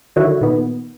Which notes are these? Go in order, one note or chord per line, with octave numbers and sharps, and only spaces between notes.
D3 D#3 F#3 E4 F#4
A#2 D#3 B3